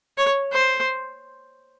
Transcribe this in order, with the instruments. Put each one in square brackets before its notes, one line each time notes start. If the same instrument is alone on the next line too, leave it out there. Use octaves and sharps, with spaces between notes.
[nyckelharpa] C#5
C5